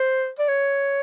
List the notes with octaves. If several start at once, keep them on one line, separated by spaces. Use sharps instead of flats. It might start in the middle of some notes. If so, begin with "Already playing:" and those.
Already playing: C5
D5
C#5